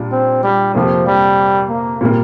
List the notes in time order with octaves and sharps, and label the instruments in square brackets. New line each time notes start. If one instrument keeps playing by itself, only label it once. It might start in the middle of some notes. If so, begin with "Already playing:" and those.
Already playing: [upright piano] A#2 G3 D4 F4
[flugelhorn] C4
G3
[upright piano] F2 C3 A#3 G4 [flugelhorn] F3
[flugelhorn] G3
A#3
[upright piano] A#2 G3 A#3